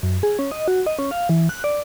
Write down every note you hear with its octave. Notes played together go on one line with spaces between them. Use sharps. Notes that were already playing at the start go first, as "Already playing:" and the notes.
F#2
G#4
C#4
D#5
F#4
D#5
C#4
F5
E3
F#6
D5